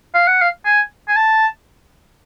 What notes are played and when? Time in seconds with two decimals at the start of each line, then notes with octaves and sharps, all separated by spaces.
0.15 F5
0.28 F#5
0.42 F5
0.65 G#5
1.08 G#5
1.16 A5